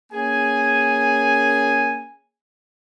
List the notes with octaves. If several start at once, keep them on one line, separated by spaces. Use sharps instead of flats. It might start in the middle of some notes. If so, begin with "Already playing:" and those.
A#3 C#4 G#4 G#5